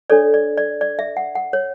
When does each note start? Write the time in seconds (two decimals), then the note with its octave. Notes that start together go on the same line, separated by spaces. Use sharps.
0.10 D4 A4 C#5 D5
0.34 D5
0.58 D5
0.81 D5
0.99 E5
1.17 F#5
1.35 F#5
1.53 C#5